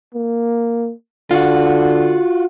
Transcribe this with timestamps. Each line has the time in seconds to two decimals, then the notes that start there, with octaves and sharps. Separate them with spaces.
0.15 A#3
1.31 D3 F4 F#4